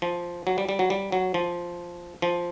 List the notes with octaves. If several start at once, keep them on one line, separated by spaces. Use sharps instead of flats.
F3
F#3
G3
G3
F#3
G3
F#3
F3
F3